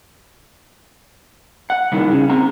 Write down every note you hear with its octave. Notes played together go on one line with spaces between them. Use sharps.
F#5
G2 D#3 E3
C#3
C4 A#5